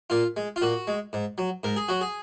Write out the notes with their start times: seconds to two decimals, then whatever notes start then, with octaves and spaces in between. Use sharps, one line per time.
0.10 A#2 F4
0.37 G#3
0.56 F4
0.62 A#2 F#4
0.87 G#3
1.13 G#2
1.38 F#3
1.63 G#2 A#4
1.76 G#4
1.88 F#3 F#4
2.01 G#4